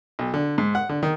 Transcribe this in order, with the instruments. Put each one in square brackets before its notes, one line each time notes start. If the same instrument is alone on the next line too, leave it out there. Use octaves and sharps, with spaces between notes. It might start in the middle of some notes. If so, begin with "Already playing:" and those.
[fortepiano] B1
D3
G#2
F#5
D3
D#3